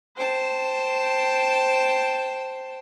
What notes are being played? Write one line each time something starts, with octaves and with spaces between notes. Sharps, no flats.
C5 G5 A5